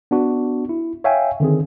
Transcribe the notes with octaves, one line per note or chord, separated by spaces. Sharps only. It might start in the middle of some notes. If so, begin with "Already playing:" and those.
B3 D4 F#4
E4
C#5 E5 F5 G5 G#5
D3 D#3 C4 G#4